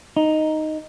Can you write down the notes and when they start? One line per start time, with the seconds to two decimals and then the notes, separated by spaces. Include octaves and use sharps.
0.17 D#4